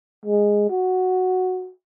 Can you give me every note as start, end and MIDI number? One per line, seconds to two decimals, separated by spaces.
0.26 0.65 56
0.70 1.71 66